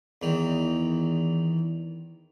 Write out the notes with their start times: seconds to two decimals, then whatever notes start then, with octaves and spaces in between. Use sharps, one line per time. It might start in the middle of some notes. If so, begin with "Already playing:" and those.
0.22 E2 D#3